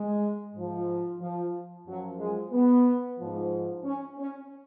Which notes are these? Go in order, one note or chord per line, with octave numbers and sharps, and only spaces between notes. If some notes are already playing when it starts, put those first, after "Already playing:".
Already playing: G#3
G#2 F3
F3
F#2 F3 F#3
G#3
B3
G#2 F3
C#4
C#4